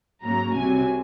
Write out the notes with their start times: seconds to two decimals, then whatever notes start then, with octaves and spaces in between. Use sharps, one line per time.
0.23 G#2 F#3 A#3 C#4 A#5
0.55 C2 C3 F#3 C4 G#5